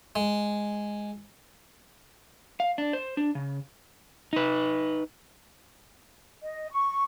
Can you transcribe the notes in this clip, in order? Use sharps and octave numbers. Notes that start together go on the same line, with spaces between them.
G#3
F5
D4
C5
D4
C#3
D#4 B4
D#5
C#6